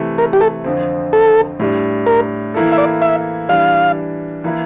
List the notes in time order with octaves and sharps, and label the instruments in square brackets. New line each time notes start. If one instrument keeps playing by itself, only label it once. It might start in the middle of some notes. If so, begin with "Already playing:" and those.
Already playing: [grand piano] C3 E3 A3
[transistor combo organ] A#4
G4
A4
[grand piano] F2 D3 F3 C4
[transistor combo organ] A4
[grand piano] A2 G3 D4
[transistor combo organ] A#4
[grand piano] E3 A#3 E4 A4
[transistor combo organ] E5
D5
E5
[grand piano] E3 G3 D4 [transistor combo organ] F5
[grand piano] E3 A#3 E4